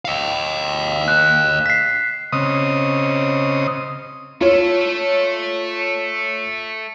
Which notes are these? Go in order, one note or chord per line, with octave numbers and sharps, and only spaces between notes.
D#5 F5
F#6
B6 C7
C#3 C4 D#5 D#6
A3 F4 A4 C#5